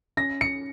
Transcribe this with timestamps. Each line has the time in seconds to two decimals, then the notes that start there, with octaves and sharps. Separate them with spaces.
0.17 C#4 A#6
0.41 C#7